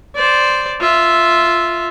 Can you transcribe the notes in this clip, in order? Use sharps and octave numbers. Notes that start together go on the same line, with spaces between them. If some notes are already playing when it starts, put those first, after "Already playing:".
C5 D5
F4 E5